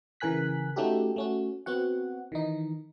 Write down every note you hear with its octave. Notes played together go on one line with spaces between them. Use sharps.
C#3 E3 A#4 G#5 F#6 B6
A3 C#4 D#4 F#4 G4 A4
A3 C#4 F#4
B3 C4 F#4 F#5
D#3 E3 D#4